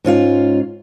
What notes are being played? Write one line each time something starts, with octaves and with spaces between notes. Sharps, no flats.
G#2 C#4 F4 F5